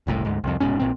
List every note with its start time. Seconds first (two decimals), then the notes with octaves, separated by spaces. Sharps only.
0.07 F#1 C2 A2
0.25 D2 G#2
0.44 C2 F2
0.60 F1 G#2 B2 C#4
0.79 A#1 A#2 C4